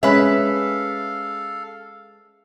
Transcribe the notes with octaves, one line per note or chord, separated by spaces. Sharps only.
G#3 C#4 A4 B4 E5 F5